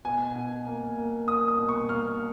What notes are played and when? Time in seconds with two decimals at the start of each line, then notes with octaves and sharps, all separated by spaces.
0.05 B2 G#5
0.36 B2
0.67 A#3
0.97 A#3
1.28 A#3 D#6
1.48 D#6
1.58 B2
1.69 C#6
1.89 A#3 F6